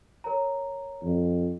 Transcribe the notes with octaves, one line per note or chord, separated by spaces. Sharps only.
A#4 C#5 A#5
F2